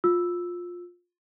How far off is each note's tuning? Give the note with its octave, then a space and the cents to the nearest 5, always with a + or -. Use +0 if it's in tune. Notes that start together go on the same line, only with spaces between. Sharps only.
F4 +20 E6 +0